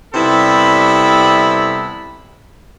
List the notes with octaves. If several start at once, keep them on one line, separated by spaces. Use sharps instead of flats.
C3 G3 B3 E4 A4 B5